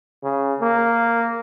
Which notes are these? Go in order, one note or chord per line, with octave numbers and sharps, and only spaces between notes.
C#3
A#3